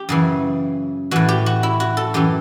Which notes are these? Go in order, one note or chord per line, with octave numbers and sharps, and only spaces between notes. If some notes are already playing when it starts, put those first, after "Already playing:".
Already playing: G4
F#2 C#3 E3
A2 E3 F#4
G4
F#4
E4
F#4
A4
F#2 E3 G4